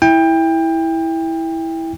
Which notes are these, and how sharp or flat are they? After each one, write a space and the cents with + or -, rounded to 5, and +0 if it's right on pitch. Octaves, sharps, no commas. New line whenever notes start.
E4 -10 G5 +25